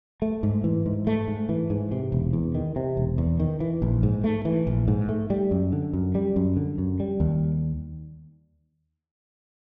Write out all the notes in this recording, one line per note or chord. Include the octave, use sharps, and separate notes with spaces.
A3
G#2
E3
G#2
A3
G#2
E3
G#2
C3
E1
E2
D#3
C3
E1
E2
D#3
E3
A#1
G#2
A3
E3
A#1
G#2
A3
G3
F#2
D3
F#2
G3
F#2
D3
F#2
G3
D#2